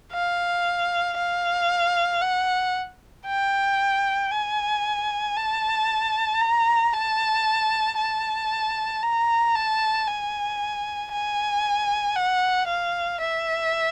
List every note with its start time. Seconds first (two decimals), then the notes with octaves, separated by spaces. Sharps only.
0.13 F5
1.17 F5
2.22 F#5
3.27 G5
4.31 G#5
5.37 A5
6.41 A#5
6.93 A5
7.98 A5
9.02 A#5
9.55 A5
10.08 G#5
11.12 G#5
12.16 F#5
12.68 F5
13.21 E5